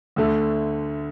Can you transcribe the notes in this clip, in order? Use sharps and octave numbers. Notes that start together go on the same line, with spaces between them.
D2 D3 A3